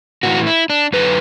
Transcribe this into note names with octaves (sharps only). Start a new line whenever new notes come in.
A2 E3 F#4
E4
D4
F#2 D3 F#3 B4